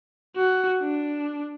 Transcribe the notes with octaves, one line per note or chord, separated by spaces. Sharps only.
F#4
D4